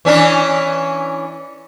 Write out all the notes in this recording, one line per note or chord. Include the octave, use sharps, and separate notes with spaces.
E3 C#4 D4